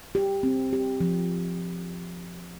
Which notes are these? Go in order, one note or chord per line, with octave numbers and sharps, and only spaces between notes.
G4
C4
G4
F3